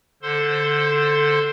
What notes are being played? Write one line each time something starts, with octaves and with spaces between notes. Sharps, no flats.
D3 A4 C5 C6